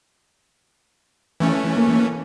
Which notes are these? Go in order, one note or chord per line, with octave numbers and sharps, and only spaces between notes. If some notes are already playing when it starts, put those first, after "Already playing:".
E3 A3 C#4
A#3